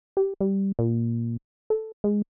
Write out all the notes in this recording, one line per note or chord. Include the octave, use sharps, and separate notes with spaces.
G4
G3
A#2
A4
G#3